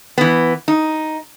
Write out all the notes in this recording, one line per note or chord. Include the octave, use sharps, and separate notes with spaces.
E3 B3
D#4